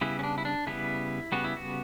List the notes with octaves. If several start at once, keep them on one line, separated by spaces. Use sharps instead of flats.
C#3 G3 B3 E4
C#4
D4
E4
D4
C#3 G3 B3 E4
C#3 G3 B3 F#4
E4
F#4